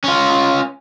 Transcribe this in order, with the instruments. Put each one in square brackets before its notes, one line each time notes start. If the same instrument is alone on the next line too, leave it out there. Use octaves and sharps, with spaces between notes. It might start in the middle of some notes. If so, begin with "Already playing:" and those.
[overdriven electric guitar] C#4 F4